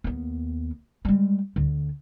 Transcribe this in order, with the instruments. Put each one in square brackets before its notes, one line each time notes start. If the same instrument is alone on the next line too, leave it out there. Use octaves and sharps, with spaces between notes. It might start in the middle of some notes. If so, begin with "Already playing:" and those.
[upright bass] D#2 B3
G3 G#3
D2 D3